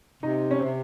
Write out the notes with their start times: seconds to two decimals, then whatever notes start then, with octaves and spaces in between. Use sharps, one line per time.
0.22 C3 D#4
0.51 C#4
0.60 C3 C4